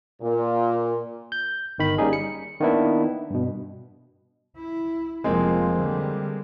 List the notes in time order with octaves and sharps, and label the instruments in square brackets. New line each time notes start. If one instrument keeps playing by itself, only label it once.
[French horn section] A#2
[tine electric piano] G6
G1 D#3 B5
G3 A#3 C#4 D#4 G#4
C#7
D#3 A#3 B3 D4 E4
G2 B2
[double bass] E4
[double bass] F1 F3 [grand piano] G#3 A#3 C4
[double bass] D3 G3